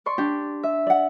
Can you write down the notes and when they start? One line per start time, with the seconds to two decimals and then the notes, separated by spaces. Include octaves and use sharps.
0.06 D5 C6 C#6
0.18 D4 G4
0.63 E5
0.87 D5 F#5